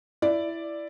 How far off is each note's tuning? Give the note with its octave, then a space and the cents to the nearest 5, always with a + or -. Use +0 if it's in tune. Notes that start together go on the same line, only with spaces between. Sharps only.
E4 +10 D5 +0